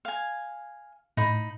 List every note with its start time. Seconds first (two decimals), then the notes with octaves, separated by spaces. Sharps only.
0.05 F5 G#5
1.17 A2 D#4 B5